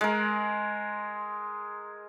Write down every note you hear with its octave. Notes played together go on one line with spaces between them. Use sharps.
G#3 A#4